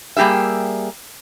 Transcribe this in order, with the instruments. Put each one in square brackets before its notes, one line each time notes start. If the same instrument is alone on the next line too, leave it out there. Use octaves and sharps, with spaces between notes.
[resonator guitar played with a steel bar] G3 A#3 G4 G#4 E5